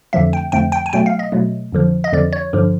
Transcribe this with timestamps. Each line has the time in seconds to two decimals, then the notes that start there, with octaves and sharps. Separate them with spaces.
0.13 F2 D3 F3 A3 E5
0.33 G5
0.52 F2 D3 F3 A3 G5
0.72 G5
0.86 G#5
0.93 B2 F#3 A3 G5
1.06 F5
1.19 D#5
1.32 B2 F#3 A3
1.72 F2 D3 F3
2.04 D#5
2.12 F2 D3 F3 D5
2.33 C#5
2.53 G2 D3 F3